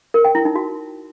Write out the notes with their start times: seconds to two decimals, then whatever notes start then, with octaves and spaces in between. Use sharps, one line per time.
0.14 A#4
0.25 G5
0.35 E4
0.45 D#4
0.55 F#4